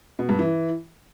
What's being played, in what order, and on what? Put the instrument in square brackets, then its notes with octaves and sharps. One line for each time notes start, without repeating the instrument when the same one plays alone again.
[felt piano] B2
G2
E3